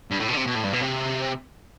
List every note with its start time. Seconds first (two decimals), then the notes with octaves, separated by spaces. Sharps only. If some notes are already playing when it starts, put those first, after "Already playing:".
0.11 G2
0.19 A2
0.29 B2
0.33 D3
0.37 C3
0.46 B2
0.55 A2
0.64 G2
0.73 B2
0.82 C3